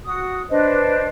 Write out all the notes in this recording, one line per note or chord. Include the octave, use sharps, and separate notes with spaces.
F#4 D#6
D4 B4 C5 D#5